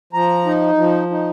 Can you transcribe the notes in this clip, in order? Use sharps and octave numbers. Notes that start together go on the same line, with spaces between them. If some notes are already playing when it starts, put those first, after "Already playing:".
F3 A#5
D#4
F3
D#4